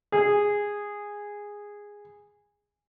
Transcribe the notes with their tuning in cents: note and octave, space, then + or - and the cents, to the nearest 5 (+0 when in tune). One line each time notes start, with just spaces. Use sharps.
G#4 -10